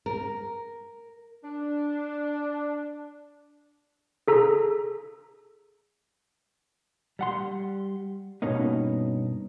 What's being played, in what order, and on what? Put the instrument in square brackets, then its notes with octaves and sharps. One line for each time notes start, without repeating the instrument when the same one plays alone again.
[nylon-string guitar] A#4
[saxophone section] D4
[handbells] G#4 A4 A#5 E6
[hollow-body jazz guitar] G3 F#5 C6
G2 B2 A#3 C#4 D#4